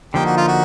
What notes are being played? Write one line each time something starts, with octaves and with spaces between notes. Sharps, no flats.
D3 F3 A#3 D#4 G4
F#4
F4
F#4